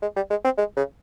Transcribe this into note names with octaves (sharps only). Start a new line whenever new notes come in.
G#3
G3
G#3
C4
G#3
C#3